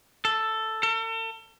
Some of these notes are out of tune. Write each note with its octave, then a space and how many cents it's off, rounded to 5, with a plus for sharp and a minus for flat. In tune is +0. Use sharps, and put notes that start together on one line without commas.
A4 +5
A4 +40